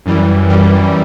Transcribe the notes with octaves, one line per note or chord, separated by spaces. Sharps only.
F#2 E3 G3
F#2 E3 G3